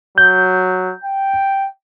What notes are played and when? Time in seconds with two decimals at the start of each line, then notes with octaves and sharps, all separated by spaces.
0.18 F#3 G6
1.04 G5